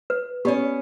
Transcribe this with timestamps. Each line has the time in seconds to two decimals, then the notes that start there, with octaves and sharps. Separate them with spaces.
0.10 B4
0.45 B3 C#4 G4 D5